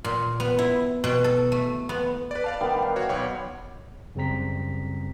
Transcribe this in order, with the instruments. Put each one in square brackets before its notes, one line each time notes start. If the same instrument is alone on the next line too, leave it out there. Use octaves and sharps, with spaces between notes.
[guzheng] A#2
B3
E4
B2
A4
A3
B3
[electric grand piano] B4 D5
D5 F5 A5
[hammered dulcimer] D#3 G3 B3
D5 F5 F#5
[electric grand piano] F#4 C#5
[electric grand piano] B1 C#5 [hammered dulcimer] D5
[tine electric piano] F#2 C#3 G3 C4 A#5 B6